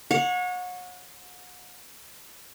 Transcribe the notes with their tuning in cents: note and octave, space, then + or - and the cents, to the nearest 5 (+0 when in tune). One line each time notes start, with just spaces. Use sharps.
C#5 +0 F#5 -35